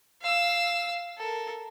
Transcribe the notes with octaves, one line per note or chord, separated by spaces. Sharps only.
F5 E6
A4 A#4